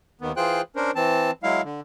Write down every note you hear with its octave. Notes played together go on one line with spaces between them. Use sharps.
D#2 D#3 B3
E3 F4 G#4 C5 G5 F#6
C#4 D4 A#4 C5
E3 C4 A5
F#3 G#3 E4 F5
D3